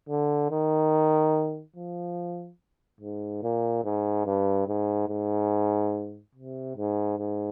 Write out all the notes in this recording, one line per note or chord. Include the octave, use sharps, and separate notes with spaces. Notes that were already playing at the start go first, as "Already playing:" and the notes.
D3
D#3
F3
G#2
A#2
G#2
G2
G#2
G#2
C3
G#2
G#2